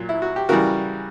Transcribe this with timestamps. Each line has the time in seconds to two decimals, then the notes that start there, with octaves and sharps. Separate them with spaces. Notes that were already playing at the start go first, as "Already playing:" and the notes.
Already playing: A#2 F#3
0.09 E4
0.22 F#4
0.36 G4
0.49 C#3 E3 G3 F#4 A#4